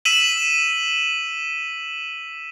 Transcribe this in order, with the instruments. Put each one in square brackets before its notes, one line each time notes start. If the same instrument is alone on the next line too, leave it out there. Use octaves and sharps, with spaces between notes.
[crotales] E6 B6 D#7 E7 F#7